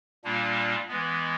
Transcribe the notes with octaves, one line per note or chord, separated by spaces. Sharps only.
A#2 G3 A#3 D4 F4
E3 G#3 B3